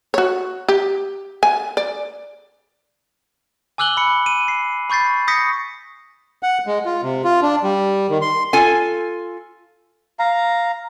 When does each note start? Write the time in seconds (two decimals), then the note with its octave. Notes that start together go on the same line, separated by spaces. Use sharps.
0.14 F#4 C#5
0.68 G4
1.43 G#5
1.77 D5
3.78 G#5 D6 E6 F#6 F#7 G7
3.97 B5 C#7
4.26 D#7
4.48 C7
4.90 B5 C#6 G6 A6 C7
5.28 C#6 D#6 G6 A#6 B6 C#7
6.43 F#5
6.67 G#3
6.86 F4
7.03 C3
7.24 F4
7.42 D4
7.63 G3
8.09 D#3
8.22 C6
8.53 F4 A4 G#5
10.19 F5 A#5